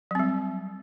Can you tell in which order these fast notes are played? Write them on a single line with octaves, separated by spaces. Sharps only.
F#3 C4 G3